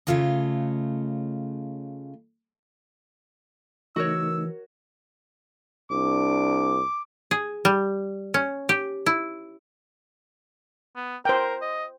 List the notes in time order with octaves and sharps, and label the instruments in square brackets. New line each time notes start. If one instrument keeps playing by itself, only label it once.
[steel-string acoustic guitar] C#3 E3 A3 F4 C#5 D#5
[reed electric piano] C#3 A3 D#4 [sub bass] E3 [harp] F#4 A#4 C#5 [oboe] E6
[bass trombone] C2 [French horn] D4 [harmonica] D6
[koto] G#4
G3
C#4
G4
E4
[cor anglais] B3
[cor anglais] A#4 [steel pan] C5 G5
[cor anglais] D#5